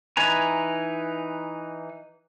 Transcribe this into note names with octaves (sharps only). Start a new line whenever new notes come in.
E3 D#4 B4 G#5 A#5